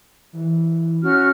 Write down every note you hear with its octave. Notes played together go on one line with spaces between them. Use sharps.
E3
C#4 F#4 F6